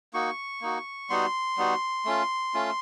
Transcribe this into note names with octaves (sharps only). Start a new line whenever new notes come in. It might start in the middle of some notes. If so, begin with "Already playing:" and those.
A#3 D#4 F#4 C#6
A#3 D#4 F#4
G3 B3 D#4 F#4 C6
G3 B3 D#4 F#4
A3 C#4 F4
A3 C#4 F4